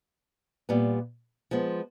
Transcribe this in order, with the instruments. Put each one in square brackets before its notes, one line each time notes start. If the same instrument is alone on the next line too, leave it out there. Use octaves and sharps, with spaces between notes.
[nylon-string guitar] A#2 G3 B3
F3 G#3 B3